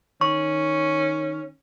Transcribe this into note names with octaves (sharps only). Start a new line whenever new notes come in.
D#3 C#4 C#6